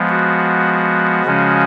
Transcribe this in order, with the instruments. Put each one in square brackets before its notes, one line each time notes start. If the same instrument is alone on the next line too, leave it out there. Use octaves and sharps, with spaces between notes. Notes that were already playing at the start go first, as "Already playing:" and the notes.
Already playing: [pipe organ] F3 G#3 B3
F#4
C#3 F3 G#3 C#4